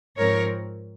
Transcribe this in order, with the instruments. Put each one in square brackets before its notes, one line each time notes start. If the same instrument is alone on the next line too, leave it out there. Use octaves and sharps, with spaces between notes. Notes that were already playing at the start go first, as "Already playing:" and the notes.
[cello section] G#2 F3 C4 A#4 C#5